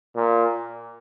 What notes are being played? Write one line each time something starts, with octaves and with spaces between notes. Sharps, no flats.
A#2